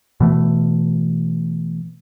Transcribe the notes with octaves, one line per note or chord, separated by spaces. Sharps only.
B2 E3 A3